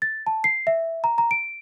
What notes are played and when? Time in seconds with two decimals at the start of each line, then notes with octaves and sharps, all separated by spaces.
0.02 A6
0.26 A5
0.44 C7
0.67 E5
1.04 A#5
1.18 A#5
1.31 D7